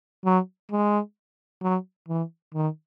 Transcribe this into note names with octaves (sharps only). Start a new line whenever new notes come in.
F#3
G#3
F#3
E3
D#3